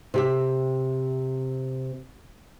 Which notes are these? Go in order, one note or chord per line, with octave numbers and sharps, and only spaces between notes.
C3 G4 E5